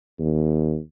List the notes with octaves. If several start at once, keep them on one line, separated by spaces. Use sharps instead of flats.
D#2